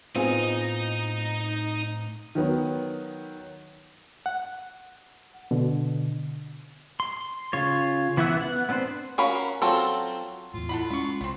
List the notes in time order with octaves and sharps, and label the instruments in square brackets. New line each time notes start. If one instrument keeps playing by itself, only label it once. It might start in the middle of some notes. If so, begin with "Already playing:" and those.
[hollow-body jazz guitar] A2 C4 F4 [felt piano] B3 G#4 G#5 [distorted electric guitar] D#4 D#5
[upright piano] D#3 F#3 B3
[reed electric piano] F#5
B2 D3
[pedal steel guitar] C6
C#3 F4 C#5
E3 B3 E4 E5 F#5
B3 F#5
B3 C4 D4 B4 C5
[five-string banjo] C#4 F#4 A#4 F5 B5
F#3 C4 F4 A4
[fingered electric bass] E2 A2 [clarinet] F4
[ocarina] E4 [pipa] A4 F#5 B5
[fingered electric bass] G#3 [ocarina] C#4 [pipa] B5 C#6
[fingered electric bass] C2 [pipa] B3 C4